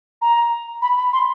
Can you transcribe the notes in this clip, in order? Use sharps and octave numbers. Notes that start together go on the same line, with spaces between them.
A#5
B5
B5
C6